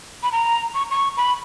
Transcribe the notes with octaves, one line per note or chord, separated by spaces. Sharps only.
B5
A#5
C#6
C#6
B5